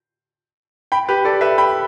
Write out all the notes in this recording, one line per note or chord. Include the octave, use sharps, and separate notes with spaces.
G5 B5
G4 B4
A4 D5
B4 E5
G5 B5